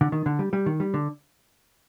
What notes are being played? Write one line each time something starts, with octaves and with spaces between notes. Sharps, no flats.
D3
D#3
D3
G3
G3
D#3
G3
D3